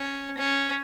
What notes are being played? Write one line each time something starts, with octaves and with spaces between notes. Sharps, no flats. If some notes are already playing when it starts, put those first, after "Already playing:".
Already playing: C#4
C#4